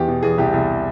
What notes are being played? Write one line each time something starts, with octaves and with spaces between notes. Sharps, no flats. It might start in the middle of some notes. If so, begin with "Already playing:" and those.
Already playing: E2 G4
B2
E2 G#4
C2 G4
C2